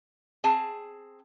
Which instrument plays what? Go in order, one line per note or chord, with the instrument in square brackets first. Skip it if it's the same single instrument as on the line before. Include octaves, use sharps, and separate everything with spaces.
[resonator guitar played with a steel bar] C4 G#4 A5